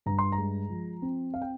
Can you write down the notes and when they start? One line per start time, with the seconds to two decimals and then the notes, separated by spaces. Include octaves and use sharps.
0.06 G2 A#5
0.19 C6
0.32 A#5
0.38 G#3
0.69 F3
1.02 C4
1.34 F5
1.42 G5